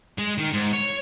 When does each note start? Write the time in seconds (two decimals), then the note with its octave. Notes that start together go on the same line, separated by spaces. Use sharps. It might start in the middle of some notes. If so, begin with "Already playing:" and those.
0.18 G#3
0.38 D#3
0.53 G#2
0.74 C#5